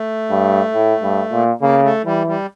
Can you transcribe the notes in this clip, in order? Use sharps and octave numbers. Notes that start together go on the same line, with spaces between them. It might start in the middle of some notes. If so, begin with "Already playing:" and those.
Already playing: A3
G2
A2
G2
A#2
C#3 A#3
A3
E3 G3
G3